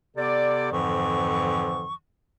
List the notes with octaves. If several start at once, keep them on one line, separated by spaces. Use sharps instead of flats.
C3 B3 A4 D5
F2 G#2 D3 E3 F3 C#6